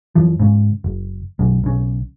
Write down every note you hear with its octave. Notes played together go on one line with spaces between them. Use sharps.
F#2 E3 F3
G#2 C#3
F#1
B1 F#2
B1 C#3